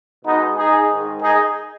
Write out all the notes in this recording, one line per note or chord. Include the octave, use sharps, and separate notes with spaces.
B2 G#3 B3 D#4
D#4 G#4
G#2 D#3 G#3
D#4 G#4